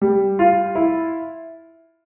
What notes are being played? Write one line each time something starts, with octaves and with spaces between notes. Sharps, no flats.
G3
F4
E4